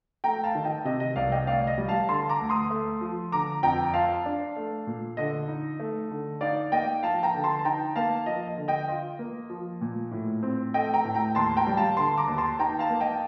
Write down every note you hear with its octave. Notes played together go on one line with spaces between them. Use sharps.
A3 G5 A#5
F5 A5
D#3
D#5 G5
C3 D#5
D#5
C2 D5 F5
D#5 G5
D2 D5 F5
D#5
G3
F5 A5
D3 A5 C6
A#5 D6
D2
C6 D#6
A3
F3
D3 A#5 D6
F2 G5 A#5
F4 F5 A5
D4
A3
A#2
D3 D#5
D#4
A3
D3
D#4 D5 F5
A#3 D#5 G5
F3 F5 A5
G5 A#5
D3
A5 C6
A5
D#4 G5 A#5
A#3 F5 A5
F3 D#5
D#5
D3
D#5 G5
F4 D#5
A#3
F3
A#2
A2
C4
A3 D#5 G5
G5 A#5
A2
G5 A#5
D#2 A5 C6
G5 A#5
G3
F5 A5
D3 A5 C6
A#5 D6
D#2
A5 C6
D#4 G5 A#5
F5 A5
A#3
D#5 G5